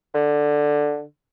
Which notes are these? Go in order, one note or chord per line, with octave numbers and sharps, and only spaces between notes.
D3